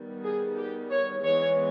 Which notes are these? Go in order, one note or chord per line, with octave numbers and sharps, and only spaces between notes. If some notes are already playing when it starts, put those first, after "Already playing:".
Already playing: D#3 G3 B3
G#4
G4
C#5
E3 G#3 B3 C#5